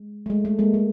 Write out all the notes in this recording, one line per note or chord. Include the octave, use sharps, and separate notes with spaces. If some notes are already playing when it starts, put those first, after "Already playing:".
Already playing: G#3
A3
G#3
A3
G#3 A#3
A3